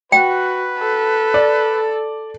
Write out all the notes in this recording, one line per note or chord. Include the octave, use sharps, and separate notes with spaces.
F#4 B4 G5
A4
D5